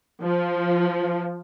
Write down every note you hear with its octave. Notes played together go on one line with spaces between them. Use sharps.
F3